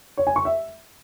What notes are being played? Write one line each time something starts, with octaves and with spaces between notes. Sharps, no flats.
C#5
G#5
C#6
E5